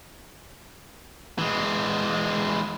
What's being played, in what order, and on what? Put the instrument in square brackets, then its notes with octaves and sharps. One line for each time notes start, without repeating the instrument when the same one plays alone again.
[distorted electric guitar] E3 G#3